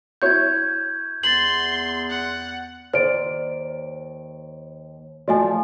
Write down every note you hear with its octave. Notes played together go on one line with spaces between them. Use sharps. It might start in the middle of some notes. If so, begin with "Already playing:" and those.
E4 F#4 C#5 G6 G#6
E2 C6 A6 F#7
F#5
D#2 C5 D5 D7
F3 A3 F#4 D5 D#5 G#5